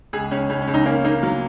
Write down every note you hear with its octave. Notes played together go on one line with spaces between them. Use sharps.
C#2 G#4
C#2 C#4
C#2 C#4
C#4
C#2
D#4
A#3 C#4
A#3 D#4
F#3